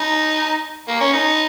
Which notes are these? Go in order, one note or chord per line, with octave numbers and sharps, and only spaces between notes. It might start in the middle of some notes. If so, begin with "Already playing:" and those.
Already playing: D#4
A#3
C#4
D#4